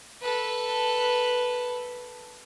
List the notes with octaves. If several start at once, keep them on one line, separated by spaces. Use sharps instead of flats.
A4 B4